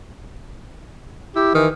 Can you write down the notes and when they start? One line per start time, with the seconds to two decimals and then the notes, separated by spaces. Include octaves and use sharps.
1.36 E4 G4
1.55 D#3 E3